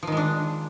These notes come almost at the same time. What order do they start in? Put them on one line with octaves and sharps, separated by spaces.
F3 D#3 G#3 D4